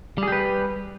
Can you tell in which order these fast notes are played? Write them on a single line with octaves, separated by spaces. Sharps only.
G3 G#4 G4 B4